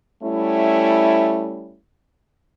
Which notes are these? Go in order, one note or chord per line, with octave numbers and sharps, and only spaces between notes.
G3 A3 C#4 E4